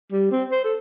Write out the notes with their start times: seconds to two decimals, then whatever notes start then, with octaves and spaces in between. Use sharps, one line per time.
0.12 G3
0.32 C4
0.51 C5
0.64 A4